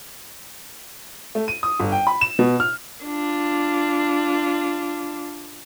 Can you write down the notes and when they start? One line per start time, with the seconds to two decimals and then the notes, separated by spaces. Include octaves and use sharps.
1.35 A3
1.48 D#7
1.63 D#6
1.80 G1
1.92 G5
2.07 B5
2.21 E7
2.39 B2
2.60 F6
3.05 D4 F4